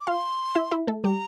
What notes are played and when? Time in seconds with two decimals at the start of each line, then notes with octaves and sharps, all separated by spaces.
0.01 D6
0.07 F4 F5 C6
0.55 E4 E5
0.71 E4 E5
0.87 A3 A4
1.04 G3 G4 A#5